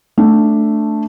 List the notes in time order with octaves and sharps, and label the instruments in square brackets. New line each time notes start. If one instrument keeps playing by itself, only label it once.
[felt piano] A3 D4